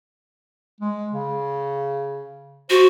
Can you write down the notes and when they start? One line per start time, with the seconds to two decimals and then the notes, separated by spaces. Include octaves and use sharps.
0.81 G#3
1.13 C#3
2.70 F#4 C5